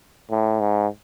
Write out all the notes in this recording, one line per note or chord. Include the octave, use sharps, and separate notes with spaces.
A2
G#2